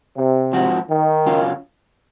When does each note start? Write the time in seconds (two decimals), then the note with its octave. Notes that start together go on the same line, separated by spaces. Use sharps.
0.17 C3
0.53 G#2 F3 C4 F#4
0.89 D#3
1.26 F#2 C#3 F#3 C#4 F4